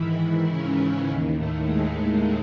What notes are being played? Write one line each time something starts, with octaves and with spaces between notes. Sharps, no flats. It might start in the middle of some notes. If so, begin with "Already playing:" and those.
Already playing: G#2 D#3 E3 E4
E3 E4
C#3 C#4
D#2 D#3
A2 A3
G#3